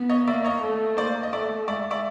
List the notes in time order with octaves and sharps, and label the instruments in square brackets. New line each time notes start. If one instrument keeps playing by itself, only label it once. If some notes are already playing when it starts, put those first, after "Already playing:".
Already playing: [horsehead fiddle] B3
[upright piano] C#5 D#5
[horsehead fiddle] A#3 [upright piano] D5 E5
[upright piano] C#5 D#5
[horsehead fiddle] A3
[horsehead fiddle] A#3 [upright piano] C5 D5
[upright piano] D#5
[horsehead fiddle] A3 [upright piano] D5 E5
[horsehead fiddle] G#3 [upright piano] D5 E5
[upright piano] D5 E5